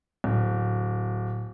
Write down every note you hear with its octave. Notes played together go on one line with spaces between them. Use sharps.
D1